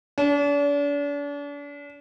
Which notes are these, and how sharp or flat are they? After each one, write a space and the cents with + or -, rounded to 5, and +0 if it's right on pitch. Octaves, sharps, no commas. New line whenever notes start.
D4 -40